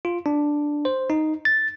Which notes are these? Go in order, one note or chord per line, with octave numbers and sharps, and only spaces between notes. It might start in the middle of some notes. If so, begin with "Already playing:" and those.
F4
D4
C5
D#4
A6